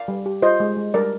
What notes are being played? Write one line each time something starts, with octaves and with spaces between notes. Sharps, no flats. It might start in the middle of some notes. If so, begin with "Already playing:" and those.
Already playing: D5 F5
G3
G4
F4 C5 D#5
G#3
G#3
G3 A#4 D5